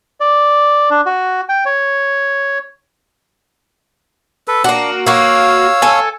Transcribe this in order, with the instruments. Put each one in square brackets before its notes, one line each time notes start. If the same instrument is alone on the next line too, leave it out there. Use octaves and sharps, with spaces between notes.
[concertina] D5
D4
F#4
G5
C#5
[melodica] A4 B4
[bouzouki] A#3 F#4 [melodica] D4
[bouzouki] A#3 F#4 [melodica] C#5 F5 E6
[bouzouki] A4 G#5